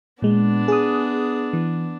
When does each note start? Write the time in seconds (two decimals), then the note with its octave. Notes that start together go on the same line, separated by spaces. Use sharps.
0.22 A#2 G#3 B3 D4
0.68 G#4 D#6
1.53 E3